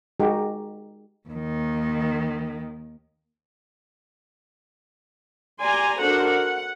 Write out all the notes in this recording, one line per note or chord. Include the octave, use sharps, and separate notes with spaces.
G#3 D#4 F#4 G4 A#4
D#2 D#3
G4 D5 G#5 A#5 C6
D4 F#4 A4 A#4 C5 F#5
F#5